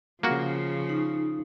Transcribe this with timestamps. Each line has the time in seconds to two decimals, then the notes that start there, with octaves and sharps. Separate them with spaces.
0.23 C#3 F3 A#3 F#4
0.89 D#4